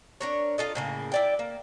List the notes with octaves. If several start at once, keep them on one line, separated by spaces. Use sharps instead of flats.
D4 A#4 C#5
F4 A4 D#5
A2 C#3 A#3
E4 D5 G5
A#3